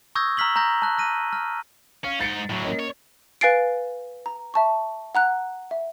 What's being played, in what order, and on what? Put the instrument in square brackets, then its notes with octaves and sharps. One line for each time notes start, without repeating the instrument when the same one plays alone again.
[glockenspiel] C#6 D#6 E6 G6 G#6 A#6
A#5 E6 F6 B6 F#7 G7
A#5 F6 G6 A#6
A5 F#6
F6 A#6 D#7
F6
[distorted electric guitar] C#4 [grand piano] F5
[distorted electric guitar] G#2 D#4 [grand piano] A6 C#7 D7
[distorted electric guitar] A2 F#3
[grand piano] A#3 C#4 D#5
[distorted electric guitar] C#5
[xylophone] B4 F5 G#5 A6 C7 D7
A#5
E5 A5 C#6
F#5 A#5 F#6
E5